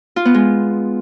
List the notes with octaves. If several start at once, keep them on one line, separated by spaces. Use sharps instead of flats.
F4
B3
G#3